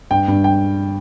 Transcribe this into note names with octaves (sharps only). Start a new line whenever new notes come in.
G2 G5
G2
G5